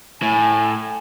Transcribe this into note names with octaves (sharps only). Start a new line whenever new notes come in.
A2 G#5